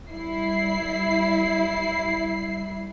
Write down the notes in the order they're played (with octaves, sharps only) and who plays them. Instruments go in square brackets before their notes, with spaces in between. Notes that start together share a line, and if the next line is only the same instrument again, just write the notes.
[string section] G3 E4 C7